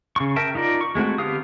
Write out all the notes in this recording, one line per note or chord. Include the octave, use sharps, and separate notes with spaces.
C#3 C#6
A#4 E5 G5 A5
D#4 F4 A#4 D5
C#6
G#3 A3 C4 F#4
D3 B3 G4 F5 D#6